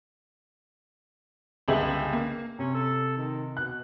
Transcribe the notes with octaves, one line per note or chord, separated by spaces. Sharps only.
G1 C#2 G4 G#4 E5 F#7
A#3
C3 C#4
A4
D#3
B2 F#6